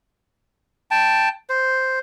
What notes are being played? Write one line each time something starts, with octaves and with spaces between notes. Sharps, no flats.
G5 A5
C5